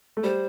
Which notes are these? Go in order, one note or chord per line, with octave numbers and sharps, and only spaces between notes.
A3
G3 C5